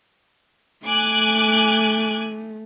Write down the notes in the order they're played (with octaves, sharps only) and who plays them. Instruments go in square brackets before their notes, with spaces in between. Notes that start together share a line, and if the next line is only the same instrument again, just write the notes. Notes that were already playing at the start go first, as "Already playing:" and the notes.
[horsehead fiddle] A3 [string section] G#5 D6 F#6